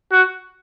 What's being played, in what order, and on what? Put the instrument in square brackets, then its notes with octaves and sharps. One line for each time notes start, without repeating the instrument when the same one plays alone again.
[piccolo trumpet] F#4